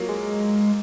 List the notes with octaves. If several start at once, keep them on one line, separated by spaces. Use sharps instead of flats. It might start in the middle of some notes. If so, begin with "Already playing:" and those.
Already playing: F#3 A#3 F4
G#3